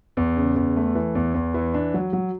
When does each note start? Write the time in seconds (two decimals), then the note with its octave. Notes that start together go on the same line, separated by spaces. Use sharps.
0.17 E2
0.37 C#3
0.56 E2
0.76 A3
0.95 E3
1.15 E2
1.34 E2
1.54 E3
1.74 D4
1.94 F#3
2.13 F#3